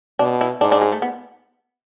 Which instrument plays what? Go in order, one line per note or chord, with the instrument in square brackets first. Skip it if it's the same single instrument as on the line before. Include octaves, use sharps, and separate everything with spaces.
[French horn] B2 [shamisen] D4
[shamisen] E4
[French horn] G#2 [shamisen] D4
[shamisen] D4
G#3
A3
B3